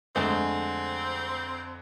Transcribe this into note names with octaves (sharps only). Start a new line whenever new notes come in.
F2 D3 G#3 A3 C4